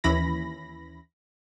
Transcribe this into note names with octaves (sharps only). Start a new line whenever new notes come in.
D#2 E3 C#4 E4 B5 A#6